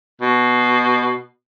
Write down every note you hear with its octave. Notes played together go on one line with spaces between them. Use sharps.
B2